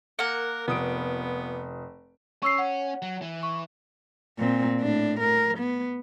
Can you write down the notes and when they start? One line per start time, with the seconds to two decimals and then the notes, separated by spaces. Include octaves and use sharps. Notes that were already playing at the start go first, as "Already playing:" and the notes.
0.19 A#3 A#4 F#5
0.68 F1 B3 D#6 D7
2.43 C#4 C#6 E6 C7
2.58 F#5
3.02 F#3
3.22 E3
3.43 C#6
4.39 A#2 C4
4.80 A2 D4
5.20 A#4
5.58 B3